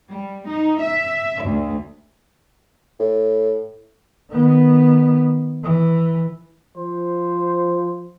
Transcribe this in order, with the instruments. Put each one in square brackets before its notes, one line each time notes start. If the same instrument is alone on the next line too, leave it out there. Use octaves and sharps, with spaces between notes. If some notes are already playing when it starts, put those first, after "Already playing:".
[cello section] G3
D#4
E5
D2
[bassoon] A2
[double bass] D#3 B3
E3
[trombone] F3 [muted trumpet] C5